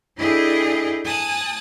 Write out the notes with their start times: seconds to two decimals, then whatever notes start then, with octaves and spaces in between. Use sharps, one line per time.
0.17 D4 E4 G#4 A4 D#5 G5
1.05 G#5 A5 D#6 F#6